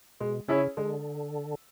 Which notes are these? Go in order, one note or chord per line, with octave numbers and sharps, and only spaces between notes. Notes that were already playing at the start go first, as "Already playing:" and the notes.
B2 G#3
C#3 C#4 E4 G#4 C#5
D3 G#3